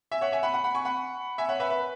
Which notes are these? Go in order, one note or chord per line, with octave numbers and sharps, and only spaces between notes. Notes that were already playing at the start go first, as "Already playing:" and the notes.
E5 G#5
C#5 F#5
E5 G#5
F#5 B5
F#5 B5
F#5 B5
G#5 C#6
F#5 B5
E5 G#5
C#5 F#5
B4 E5
B4